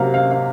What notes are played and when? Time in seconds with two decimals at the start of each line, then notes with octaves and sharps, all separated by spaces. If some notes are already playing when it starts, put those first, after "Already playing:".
Already playing: C3 F#3 A#3 F5 F#5
0.14 F5
0.31 F5